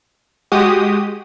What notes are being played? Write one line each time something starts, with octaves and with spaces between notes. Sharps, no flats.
G#3 F#4 G4 D#6